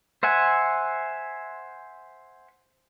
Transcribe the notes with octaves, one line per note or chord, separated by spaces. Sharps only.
C5 E5 F#5 G#5